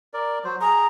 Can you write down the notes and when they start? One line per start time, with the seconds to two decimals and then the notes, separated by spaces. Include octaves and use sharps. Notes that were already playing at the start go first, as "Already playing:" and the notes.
0.14 A#4 D5
0.44 F#3 C5
0.61 G#4 A#5